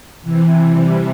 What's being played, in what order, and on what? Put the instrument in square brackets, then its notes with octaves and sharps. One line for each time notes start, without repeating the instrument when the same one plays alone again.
[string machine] C3 E3
E3 G3